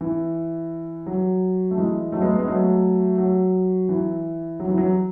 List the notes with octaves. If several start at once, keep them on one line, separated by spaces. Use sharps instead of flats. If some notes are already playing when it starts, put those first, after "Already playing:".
E3
F#3
A3
E3 G#3
F#3 A3
G#3 B3
G#3 B3
F#3 A3
F#3
E3
F#3
E3
F#3